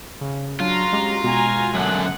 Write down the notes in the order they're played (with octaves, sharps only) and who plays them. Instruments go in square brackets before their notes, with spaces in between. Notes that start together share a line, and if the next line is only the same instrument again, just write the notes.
[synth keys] C#3
[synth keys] F#3 D4 [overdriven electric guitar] F4 [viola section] F#4 A#5
[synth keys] G#3 C#4 G4
[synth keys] B2 G#3 B3 [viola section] F#4 G#5 A#5
[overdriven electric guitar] F#2 D3 [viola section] F#5